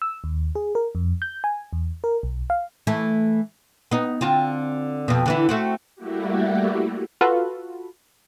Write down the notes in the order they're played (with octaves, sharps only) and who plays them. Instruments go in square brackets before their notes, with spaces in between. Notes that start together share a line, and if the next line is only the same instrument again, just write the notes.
[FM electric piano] E6
D#2
G#4
A#4
F2
G6
G#5
E2
A#4
B1
F5
[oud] E3 A3
B3 D#4
D3 C4 F4
F2 B2
D3 E3 E4
A3 C4 F#4
[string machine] G3 A3 A#3 E4 F#4 G4
[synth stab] F4 F#4 A4 B4